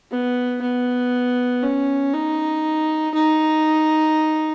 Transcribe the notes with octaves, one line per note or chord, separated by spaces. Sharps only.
B3
B3
C#4
D#4
D#4